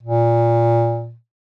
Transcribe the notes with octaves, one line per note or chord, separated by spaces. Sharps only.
A#2